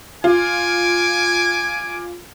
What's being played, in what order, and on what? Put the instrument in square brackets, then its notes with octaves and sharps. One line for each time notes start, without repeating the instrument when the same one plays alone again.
[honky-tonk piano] F4 [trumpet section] G#5 D6